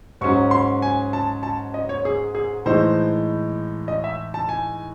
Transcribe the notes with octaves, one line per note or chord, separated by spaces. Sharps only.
G#2 F#3 C#4 C#6
C6
G#5
A5
A5
D#5
C#5
G#4
G#4
A2 E3 G#3 D#4 C5
D#5
E5
A5
G#5